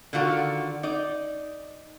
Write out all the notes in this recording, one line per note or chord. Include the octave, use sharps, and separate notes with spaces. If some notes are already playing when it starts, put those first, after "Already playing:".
D3 D#3 F4 F#4 A4
D#4 D5